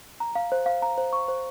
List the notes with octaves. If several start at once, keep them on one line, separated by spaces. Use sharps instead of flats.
A#5
F5
C5
F5
A#5
C5
C#6
C5